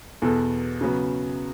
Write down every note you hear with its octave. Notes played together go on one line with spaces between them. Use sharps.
E2 B2 B3 A4
C#3 F#3 B3